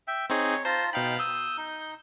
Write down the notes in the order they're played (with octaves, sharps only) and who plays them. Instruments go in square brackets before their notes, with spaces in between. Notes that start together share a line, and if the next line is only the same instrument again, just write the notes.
[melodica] E5 G5
[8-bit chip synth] C4 D#4 G#4 [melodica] C#5
[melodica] F4 A5 A#5 [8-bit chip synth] C5
[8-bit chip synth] B2 F5 B5 [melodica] D#4 G5
[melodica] D#6 E6 [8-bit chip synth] G6
[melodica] D#4